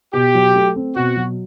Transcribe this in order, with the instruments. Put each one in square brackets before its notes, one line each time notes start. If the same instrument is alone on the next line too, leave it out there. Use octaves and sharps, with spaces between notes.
[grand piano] B2 [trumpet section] G4
[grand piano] F#3
A3
C4
[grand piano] B2 [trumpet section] F#4
[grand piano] F#3